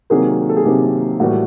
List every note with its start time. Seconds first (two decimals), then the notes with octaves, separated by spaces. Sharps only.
0.10 C3 D#3 F#3 A#3 G#4
0.49 A4
0.57 G#4
0.64 C3 D#3 F#3 A#3 G4
1.20 A2 E3 G3 A#3 F#4